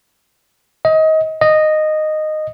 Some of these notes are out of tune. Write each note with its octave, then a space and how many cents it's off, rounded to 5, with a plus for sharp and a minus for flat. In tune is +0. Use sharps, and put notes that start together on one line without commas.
D#5 +25
D#5 -10